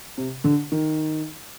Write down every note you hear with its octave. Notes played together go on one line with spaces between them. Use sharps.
C3
D3
D#3